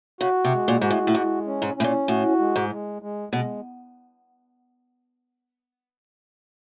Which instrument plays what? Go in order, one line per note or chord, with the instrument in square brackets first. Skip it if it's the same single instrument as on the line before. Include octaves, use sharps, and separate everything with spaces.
[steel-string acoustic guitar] C#3 [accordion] F#4
[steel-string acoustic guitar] C3
[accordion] G#3
[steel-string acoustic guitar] A#2
[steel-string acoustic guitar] G#2 [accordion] F#4
[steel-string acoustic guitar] A2
A2
[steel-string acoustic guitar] G#2 [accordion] G#3
[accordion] C#4
[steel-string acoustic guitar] G#2
[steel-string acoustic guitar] A2 [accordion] C#4
[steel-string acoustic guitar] A#2
[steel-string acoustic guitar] A2 [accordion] F#4
[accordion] G#3
[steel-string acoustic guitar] G#2
[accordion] G#3
G#3
[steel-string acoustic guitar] B2 [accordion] G#3